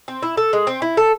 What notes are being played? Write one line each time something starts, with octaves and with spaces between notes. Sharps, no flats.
C4
E4
A4
G#3
C4
E4
A4